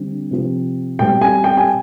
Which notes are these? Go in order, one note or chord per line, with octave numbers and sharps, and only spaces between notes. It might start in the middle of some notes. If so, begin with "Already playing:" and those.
Already playing: D3 G3 C4
C3 F3 C4
B2 G3 C4 G5
G#5
G5
G#5